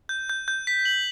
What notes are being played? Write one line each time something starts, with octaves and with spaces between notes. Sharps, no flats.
G6
G6
G6
B6
F#7